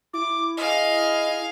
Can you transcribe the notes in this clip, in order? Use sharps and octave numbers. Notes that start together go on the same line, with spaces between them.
E4 D6
G#4 D#5 F5